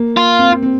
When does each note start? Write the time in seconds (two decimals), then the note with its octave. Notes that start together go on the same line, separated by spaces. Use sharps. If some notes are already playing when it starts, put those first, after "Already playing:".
Already playing: A#3
0.17 F4
0.39 C4
0.51 C4
0.62 C4